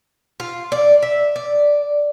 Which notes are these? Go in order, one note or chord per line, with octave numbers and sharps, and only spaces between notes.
F4
D5
E5
D5